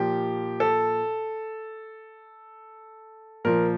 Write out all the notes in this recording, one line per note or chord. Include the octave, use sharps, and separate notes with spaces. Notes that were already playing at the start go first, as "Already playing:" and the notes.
Already playing: A#2 F3 G4
A4
A#2 F3 A#4